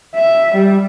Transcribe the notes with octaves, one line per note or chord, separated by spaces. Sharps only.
E5
G3